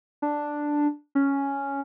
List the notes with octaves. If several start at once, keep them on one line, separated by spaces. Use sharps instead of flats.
D4
C#4